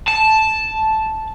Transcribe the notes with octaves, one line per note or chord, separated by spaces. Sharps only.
A5